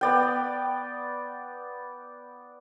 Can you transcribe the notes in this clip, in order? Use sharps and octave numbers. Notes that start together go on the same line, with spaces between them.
B3 D5 G5